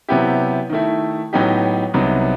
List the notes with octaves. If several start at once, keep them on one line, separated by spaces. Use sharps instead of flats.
C3 F#3 B3 E4 G4
D#3 A3 E4
A2 F#3 B3 D#4 G4
C2 C3 F#3 B3 D#4